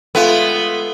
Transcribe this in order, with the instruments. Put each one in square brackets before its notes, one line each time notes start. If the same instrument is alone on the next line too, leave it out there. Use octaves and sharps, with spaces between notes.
[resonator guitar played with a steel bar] G#3 A3 F4 [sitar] B3 [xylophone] A4